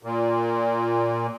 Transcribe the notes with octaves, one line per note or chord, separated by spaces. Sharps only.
A#2